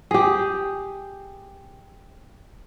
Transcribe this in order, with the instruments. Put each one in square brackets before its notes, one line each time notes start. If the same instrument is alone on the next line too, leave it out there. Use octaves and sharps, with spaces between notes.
[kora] G4 G#4